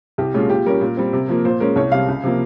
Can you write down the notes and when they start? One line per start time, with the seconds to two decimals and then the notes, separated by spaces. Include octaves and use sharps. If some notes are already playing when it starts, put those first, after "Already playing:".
0.18 C2 G4
0.34 A#2 G#3 C#4 F4
0.49 A#2 G4
0.66 G3 C#4 A#4
0.81 A#2
0.97 G3 C4
1.13 C3
1.29 F3 A#3
1.45 A#2 C5
1.60 G#3 C#4 A#4
1.76 C2 C#5
1.91 C3 G3 F5
2.08 C#2
2.24 C3 F3 A#3